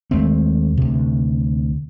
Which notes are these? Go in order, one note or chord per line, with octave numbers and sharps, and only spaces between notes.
D#2 G#3 A3 C4
D2 C3